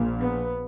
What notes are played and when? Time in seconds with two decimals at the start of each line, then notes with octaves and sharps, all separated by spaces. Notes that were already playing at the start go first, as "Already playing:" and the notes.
Already playing: A#1 A#2
0.20 B3